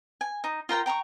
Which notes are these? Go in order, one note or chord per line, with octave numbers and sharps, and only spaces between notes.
G#5
D#4
F4 A#4 G5 A#5
G5 A#5 C6 C#6